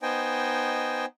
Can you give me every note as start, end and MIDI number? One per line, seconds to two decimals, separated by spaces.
0.02 1.05 59
0.02 1.05 63
0.02 1.05 72
0.02 1.05 75
0.02 1.05 79
0.02 1.05 80